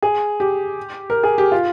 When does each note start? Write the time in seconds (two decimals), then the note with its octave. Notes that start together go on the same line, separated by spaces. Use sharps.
0.02 G#4
0.40 G4
1.10 A#4
1.23 G#4
1.38 G4
1.52 F4